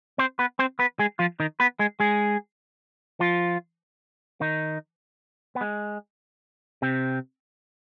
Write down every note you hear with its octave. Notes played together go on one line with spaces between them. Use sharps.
C4 C5
B3 B4
C4 C5
B3 B4
G#3 G#4
F3 F4
D#3 D#4
B3 B4
G#3 G#4
G#3 G#4
F3 F4
D#3 D#4
B3
G#3
C3 C4